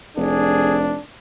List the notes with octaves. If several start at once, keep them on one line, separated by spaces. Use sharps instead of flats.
F1 D4 G#4